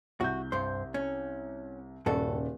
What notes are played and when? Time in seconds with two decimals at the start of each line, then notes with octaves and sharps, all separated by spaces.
0.21 C2 F#4 G6
0.52 G2 C5
0.94 C#4
2.06 D#1 G2 C#3 F#4 A4 D5